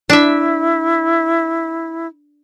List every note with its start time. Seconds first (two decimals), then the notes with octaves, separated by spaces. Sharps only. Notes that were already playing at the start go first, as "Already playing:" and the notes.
0.10 D4 E4 E5